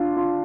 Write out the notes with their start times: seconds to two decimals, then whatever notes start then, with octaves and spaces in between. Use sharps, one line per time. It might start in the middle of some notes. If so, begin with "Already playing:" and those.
Already playing: D4 F4
0.16 F4